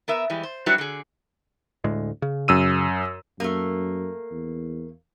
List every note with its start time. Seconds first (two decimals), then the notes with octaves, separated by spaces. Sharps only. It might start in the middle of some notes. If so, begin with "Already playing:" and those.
0.08 B3 A#4 E5
0.30 E3 G3 G#3
0.43 C5
0.66 F#3 G3 D4 E4 F#4 B4
0.78 D3 G#4
1.84 D2 A2 G#3
2.22 C#3
2.48 F#2 E6 D#7
3.40 F#2 A3 A#3
4.31 E2